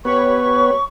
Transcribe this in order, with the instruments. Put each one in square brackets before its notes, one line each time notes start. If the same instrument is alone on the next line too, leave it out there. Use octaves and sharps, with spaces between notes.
[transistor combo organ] B3 B4 [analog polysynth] G4 C#5 B5 [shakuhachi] C#6